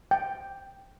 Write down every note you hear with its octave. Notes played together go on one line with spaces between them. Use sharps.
G5